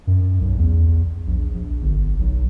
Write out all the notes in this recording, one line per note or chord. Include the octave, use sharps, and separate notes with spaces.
F#2
B1
E2
A#1
A#1
G1
B1